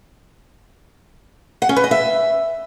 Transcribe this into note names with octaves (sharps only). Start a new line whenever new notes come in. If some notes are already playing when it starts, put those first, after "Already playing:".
F#5
C#4
B4
D#5
E5